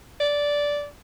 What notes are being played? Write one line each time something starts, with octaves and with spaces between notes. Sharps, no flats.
D5